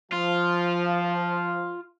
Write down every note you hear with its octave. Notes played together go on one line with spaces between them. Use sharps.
F3 F4